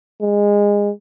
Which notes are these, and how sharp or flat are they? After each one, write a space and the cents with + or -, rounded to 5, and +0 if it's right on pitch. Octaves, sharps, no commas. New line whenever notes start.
G#3 -20